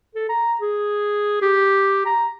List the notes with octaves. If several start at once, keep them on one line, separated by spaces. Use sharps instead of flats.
A4
A#5
G#4
G4
A#5